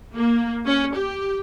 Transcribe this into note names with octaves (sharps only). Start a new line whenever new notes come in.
A#3
C#4
G4